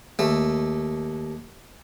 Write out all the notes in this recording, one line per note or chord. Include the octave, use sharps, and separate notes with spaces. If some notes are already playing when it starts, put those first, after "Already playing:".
D#2 A3